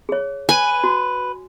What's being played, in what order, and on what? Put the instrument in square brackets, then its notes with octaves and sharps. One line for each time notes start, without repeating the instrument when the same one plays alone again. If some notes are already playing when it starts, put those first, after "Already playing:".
[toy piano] G#4 C#5
[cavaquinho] B4 [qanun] G#5
[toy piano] F#4